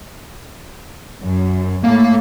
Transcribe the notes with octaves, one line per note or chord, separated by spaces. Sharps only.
F#2
A2 A3 A#3 F5